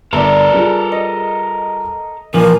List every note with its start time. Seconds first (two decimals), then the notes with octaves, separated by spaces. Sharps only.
0.13 G1 A4 A#4 D5 E5
0.53 G3 F4 G#4
0.92 D#5
2.34 A#2 E3 F3 A#4 G#5 D6